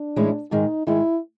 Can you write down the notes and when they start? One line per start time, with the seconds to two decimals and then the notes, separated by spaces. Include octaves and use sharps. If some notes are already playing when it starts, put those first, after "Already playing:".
Already playing: D4
0.16 A2 E3 G#3 C#4 E4
0.51 G#2 D#3 G#3 D#4
0.87 G#2 D#3 G#3 E4